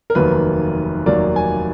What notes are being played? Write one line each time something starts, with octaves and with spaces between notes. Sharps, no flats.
A#4
F1 D#2 D#3 F#3 A#3 B4
F1 D#2 D#3 F#3 A#3 D5
G#5